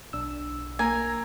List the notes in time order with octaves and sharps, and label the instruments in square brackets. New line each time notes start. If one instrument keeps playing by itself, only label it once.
[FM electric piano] B1 D4 E6
[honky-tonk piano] A#3 [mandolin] G#5 [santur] A#5